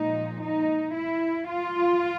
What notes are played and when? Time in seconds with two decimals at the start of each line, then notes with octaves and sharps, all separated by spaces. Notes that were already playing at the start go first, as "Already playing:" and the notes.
Already playing: A#2 F3 G#3 D#4
0.41 D#4
0.95 E4
1.49 F4